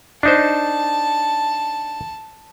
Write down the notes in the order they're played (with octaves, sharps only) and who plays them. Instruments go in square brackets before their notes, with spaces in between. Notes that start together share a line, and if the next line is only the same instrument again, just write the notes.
[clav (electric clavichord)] D4 D#4 C5 [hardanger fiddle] A5